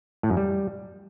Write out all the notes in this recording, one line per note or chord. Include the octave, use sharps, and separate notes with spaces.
A2
F#2
G3